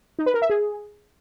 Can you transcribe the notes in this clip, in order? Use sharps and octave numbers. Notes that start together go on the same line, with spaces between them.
D#4
B4
A#4
E5
G#4